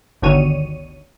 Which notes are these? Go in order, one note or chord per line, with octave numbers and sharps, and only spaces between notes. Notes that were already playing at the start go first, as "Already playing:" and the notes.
G1 D2 D3 D#3 C#5 D#7